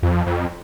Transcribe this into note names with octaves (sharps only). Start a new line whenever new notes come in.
F2
F2